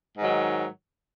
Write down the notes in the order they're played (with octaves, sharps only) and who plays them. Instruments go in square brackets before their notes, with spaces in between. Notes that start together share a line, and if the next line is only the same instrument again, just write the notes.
[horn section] G#2 D#3 F#3